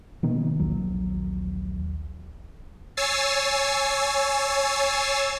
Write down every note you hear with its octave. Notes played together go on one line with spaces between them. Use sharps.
B2 D#3 A#3
A#1 D#2 F#3
C#5 G#5 E6 A6 C7